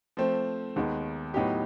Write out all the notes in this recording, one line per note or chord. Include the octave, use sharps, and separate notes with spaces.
F3 A3 C4
D#2 D#3 G#3 B3
A2 F#3 B3 D#4 G4